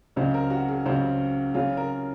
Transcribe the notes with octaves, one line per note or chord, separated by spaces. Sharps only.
C#2 C#3 F#3 C5
A#4
F#4
G#4
C#2 C#3 F#3 C5
C#3 F#3 C#4 F4 G#4
A#4